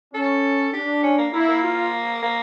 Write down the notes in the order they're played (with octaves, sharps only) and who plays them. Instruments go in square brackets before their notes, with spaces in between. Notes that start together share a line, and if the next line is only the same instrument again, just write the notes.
[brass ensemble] C#4 [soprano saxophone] A4
[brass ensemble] D4 [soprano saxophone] G4
[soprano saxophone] C#4
A#3
[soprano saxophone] A#3 [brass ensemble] E4
[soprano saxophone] A#3
[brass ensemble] F4
[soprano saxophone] A#3